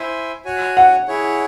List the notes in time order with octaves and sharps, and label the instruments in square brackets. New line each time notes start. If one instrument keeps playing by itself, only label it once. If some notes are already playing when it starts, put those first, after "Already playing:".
Already playing: [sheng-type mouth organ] E4 C5 E5 G#5
F#4 C#5 G#5
[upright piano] F#5
[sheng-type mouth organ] E4 G#4 C#5